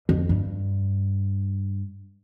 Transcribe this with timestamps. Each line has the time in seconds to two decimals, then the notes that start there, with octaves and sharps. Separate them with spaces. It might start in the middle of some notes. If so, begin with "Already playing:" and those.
0.09 F2
0.29 G2